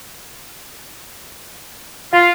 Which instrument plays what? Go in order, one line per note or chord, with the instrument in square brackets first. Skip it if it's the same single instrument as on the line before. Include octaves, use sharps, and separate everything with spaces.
[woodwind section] F4 [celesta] F5